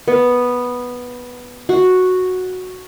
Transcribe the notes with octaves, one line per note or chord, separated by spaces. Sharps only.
B3
F#4